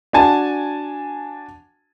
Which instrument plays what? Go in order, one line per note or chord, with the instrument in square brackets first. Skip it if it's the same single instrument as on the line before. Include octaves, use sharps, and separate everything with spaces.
[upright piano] D4 F#4 G#5 A5